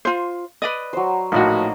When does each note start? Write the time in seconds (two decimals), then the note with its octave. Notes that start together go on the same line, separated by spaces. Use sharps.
0.05 F4 C5
0.62 B4 D5 D#5
0.93 F#3 C5
1.32 A#1 A2 A#3 D#4 F#4